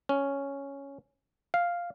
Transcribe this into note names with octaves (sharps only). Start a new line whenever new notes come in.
C#4
F5